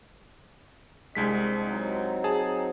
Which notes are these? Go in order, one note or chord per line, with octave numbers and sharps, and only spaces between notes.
C2 G#3 C4 D4 D#5 B6
F#3 C4 D#4
G#4 A5